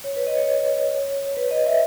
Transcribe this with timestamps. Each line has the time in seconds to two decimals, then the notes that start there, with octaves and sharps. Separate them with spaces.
0.04 C#5
0.16 B4
0.27 D#5
0.37 C#5
1.37 B4
1.51 D#5
1.66 E5